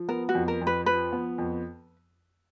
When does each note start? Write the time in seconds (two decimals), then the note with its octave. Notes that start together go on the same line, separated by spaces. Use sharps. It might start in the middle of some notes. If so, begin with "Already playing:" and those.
Already playing: F3
0.09 B3 A#4
0.29 F#4
0.35 F2
0.48 A#4
0.61 F2
0.67 B4
0.86 F3 B4
1.13 B3
1.38 F2